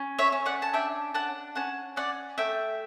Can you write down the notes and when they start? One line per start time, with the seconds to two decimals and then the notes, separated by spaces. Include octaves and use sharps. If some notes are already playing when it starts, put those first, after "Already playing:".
Already playing: C#4
0.19 C#5 E5
0.32 C#4
0.46 D5 F#5
0.62 A5
0.73 D4 E5 G5
1.14 D4 F#5 A5
1.55 C#4 F#5 A5
1.96 C#4 D5 F#5
2.38 A3 E5 G5